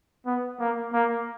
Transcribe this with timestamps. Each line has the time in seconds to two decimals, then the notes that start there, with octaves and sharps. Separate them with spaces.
0.26 B3
0.59 A#3
0.93 A#3